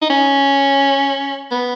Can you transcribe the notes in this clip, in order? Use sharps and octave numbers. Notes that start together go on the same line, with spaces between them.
D#4
C#4
B3